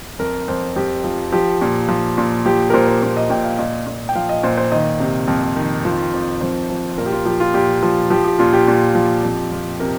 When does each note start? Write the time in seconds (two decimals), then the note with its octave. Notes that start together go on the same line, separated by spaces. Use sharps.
0.19 F2 A#4
0.48 F2 C5
0.76 F2 G4
1.04 F3
1.32 F3 G4
1.61 A#2
1.89 F3
2.18 A#2
2.46 F3 G4
2.70 A#4
2.74 A#2 C5
2.88 C5
3.02 A#2 C5
3.17 D#5
3.30 A#2 G5
3.44 F5
3.58 A#2 D#5
3.87 A#2
4.09 G5
4.15 F3 F5
4.29 D#5
4.43 A#2 C5
4.57 C5
4.72 D#3 D#5
5.00 C3
5.28 F2
5.56 D#3
5.85 F3
6.14 F2
6.41 F2 C5
6.70 F3
6.98 A#2 A#4
7.06 G4
7.12 F4
7.25 F3 G4
7.40 F4
7.54 A#2 G4
7.83 F3
8.10 F3 G4
8.25 G4
8.39 A#2 F4
8.53 G4
8.68 A#2
8.95 F3
9.23 F2
9.52 F2
9.80 C3 A#4